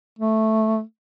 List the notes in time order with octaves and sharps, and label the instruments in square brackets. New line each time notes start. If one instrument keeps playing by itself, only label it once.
[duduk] A3